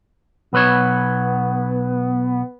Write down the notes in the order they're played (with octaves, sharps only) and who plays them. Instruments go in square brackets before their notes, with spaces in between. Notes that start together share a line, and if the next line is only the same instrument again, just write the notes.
[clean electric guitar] B1 B4 C#5 [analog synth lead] B3